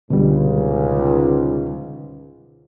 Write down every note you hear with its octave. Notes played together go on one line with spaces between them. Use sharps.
C#2 G#2 B2 D3 G3